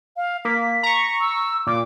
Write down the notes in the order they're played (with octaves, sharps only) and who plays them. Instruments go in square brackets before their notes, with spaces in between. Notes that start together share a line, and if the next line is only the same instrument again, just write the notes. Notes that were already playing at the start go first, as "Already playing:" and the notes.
[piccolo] F5
[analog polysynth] A#3 [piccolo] B6
[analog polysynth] A#5 C#6
[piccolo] E6
[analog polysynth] A#2 [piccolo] D6